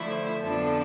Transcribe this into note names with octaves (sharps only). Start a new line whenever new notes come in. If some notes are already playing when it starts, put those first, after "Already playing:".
Already playing: D3 F3 A3 E4
C5
F2 D3 F3 B3 D4 A5